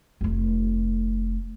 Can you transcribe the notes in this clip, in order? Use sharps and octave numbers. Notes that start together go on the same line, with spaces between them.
F1 A3